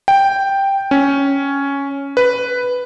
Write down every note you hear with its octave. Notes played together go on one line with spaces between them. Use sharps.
G5
C#4
B4